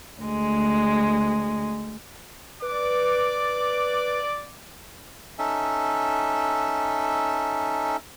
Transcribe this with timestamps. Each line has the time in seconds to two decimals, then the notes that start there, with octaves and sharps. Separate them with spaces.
0.22 D2 G#3
2.62 B4 D5 D6
5.39 C#4 D#4 A4 E5